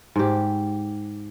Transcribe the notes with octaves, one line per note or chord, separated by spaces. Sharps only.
G#2 G4